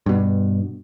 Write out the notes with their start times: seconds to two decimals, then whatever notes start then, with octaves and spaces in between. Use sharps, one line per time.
0.06 G2 B2